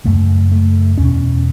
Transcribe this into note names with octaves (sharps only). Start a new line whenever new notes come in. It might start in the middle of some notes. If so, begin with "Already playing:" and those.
F#2 C#3 A3
A3
E2 B2 C#4